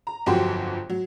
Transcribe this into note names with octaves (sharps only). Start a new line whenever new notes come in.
A#5
G1 F2 F#3 F#4 G4 C6
F#3